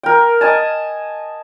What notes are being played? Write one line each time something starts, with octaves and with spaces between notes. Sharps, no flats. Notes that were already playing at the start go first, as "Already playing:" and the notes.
A#4 G5
D#5 G#5 A5